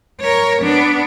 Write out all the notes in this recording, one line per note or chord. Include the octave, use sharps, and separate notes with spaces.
A#4 C#5
B3 D4